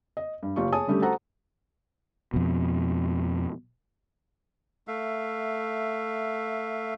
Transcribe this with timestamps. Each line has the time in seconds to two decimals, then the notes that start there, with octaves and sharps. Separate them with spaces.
0.17 D#5
0.43 G2
0.56 F#1 F4 G4 C#6
0.72 G#4 C#5 G#5 A5 D#6
0.87 D3 G3 A3 C#4 G4
1.02 F#4 A4 C5 F#5 A#5
2.34 F2 B2
4.88 A3 E5 F5